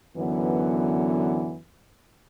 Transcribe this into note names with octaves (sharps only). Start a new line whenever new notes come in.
F#2 D3 E3 F#3 B3